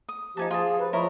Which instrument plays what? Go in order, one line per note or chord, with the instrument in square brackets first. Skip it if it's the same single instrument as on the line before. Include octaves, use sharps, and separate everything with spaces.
[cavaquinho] D#6
[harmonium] F3 G4 [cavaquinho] D#4 G#5 A5
[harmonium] F3 G#4 [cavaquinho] F4 A5
[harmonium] B4
[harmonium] F3 C#5 [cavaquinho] E4 A#4 D#5